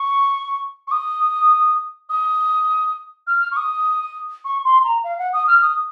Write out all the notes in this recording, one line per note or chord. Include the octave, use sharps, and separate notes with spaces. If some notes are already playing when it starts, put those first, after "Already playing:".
Already playing: C#6
C#6
D#6
D#6
F6
C#6
D#6
C#6
C6
A#5
F5
F#5
D#6
F6
D#6